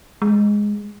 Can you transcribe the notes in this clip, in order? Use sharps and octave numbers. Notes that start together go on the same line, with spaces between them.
G#3